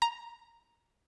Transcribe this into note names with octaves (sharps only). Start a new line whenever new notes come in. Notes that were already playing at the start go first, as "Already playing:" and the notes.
A#5